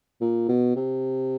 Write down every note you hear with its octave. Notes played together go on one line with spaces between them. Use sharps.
A#2
B2
C3